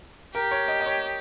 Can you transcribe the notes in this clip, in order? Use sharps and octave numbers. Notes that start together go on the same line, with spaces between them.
G4 A#4
C#5
D#5
D#5
C#5